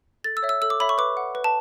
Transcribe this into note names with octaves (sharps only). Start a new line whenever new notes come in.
A4 A6
E6
C#5 E5
E6
A4 E6
D6
C#5 E5 B5
C#6
B4 D6
F#5
B4
A5